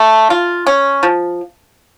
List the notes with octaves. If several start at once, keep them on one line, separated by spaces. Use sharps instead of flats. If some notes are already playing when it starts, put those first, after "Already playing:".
Already playing: A3
F4
C#4
F3